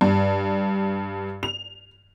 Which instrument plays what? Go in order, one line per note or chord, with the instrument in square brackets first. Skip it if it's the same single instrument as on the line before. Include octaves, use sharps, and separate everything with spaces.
[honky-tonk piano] G2
F7